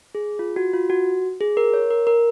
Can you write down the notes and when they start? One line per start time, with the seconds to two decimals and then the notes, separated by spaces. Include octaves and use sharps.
0.15 G#4
0.39 F4
0.56 F#4
0.73 F4
0.90 F#4
1.41 G#4
1.57 A#4
1.73 C#5
1.90 A#4
2.07 A#4